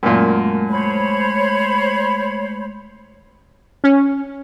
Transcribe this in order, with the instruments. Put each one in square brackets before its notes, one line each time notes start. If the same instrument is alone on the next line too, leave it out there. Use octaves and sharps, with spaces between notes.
[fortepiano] F#2 A#2 [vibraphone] G#3 A3
[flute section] C5 C#5 B5
[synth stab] C#4